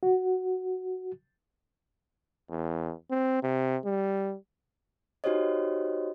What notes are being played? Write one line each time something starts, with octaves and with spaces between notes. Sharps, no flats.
F#4
E2
C4
C3
G3
D#4 F#4 G4 C5 C#5 D#5